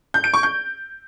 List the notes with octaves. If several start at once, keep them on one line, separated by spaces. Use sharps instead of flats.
G6
D7
C#6
G6